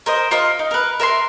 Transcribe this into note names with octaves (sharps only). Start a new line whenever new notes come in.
A#4 C5 D#5
F4 A#4 D#5
D#4
A#4 B4
A#4 E5 G#5 C6